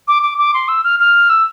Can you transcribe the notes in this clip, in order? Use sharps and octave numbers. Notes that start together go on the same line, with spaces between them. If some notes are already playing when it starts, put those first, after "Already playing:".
D6
D6
D6
C6
E6
F6
F6
E6